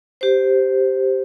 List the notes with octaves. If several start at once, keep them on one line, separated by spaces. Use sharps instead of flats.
G4 C5